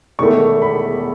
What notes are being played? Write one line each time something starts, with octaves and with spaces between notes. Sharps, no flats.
E1 E2 D#3 A3 C#6
B5